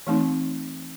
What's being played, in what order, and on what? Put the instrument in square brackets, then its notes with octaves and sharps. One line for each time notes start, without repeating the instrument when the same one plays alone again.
[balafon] E3 A3 C4 D#4